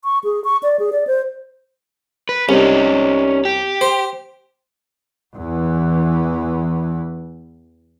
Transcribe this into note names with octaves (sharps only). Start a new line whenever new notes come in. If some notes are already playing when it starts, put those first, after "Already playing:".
C#6
G#4
C#6
D5
G#4
D5
C5
B4
C2 C#4 D#4
G4
C5
E2 E3